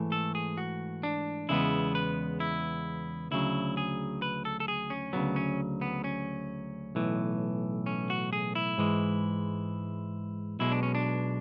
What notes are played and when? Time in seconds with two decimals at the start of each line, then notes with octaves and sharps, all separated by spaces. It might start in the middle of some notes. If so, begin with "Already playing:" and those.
Already playing: G#2 E3 A3
0.12 A4
0.35 G#4
0.57 F#4
1.03 D4
1.49 E2 C#3 G#3 B3 E4
1.95 B4
2.40 E4
3.31 D2 C#3 F#3 E4
3.77 G#4
4.22 B4
4.45 A4
4.60 A4
4.68 G#4
4.90 C#4
5.13 D2 C#3 F#3 B3
5.36 C#4
5.81 B3
6.04 C#4
6.95 B1 A2 E3
7.86 C#4
8.10 F#4
8.33 G#4
8.55 E4
8.78 G#2 E3 G#3
10.59 B1 B2 G#3 E4
10.72 D4
10.83 C#4
10.95 D4